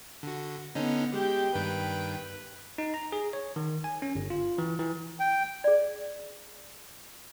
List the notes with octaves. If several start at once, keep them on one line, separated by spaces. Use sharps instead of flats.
D3 F#4
D3 B3 C#4 D#4
G#3 G4 G5
G2 D#3 B4 G5
D#4
A#5
G#4
C#5
D#3
G#5
C#4
G1
F4
E3
E3
G5
G#4 D5